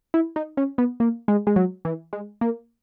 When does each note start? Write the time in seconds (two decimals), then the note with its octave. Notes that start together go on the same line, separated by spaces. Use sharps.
0.14 E4
0.36 D#4
0.57 C#4
0.78 B3
1.00 A#3
1.28 G#3
1.47 G#3
1.56 F#3
1.85 E3
2.13 G#3
2.41 A#3